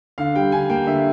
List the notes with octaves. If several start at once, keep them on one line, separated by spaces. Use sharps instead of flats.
D3 F5
G3 G5
D3 G#5
A#3 G5
D3 E5